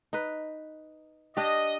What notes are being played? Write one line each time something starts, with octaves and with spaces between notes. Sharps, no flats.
D#4 B4
D4 G4 D#5